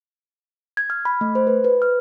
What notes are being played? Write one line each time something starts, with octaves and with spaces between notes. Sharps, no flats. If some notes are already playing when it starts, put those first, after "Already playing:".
G#6
F6
B5
A3
C5
B4
B4
F6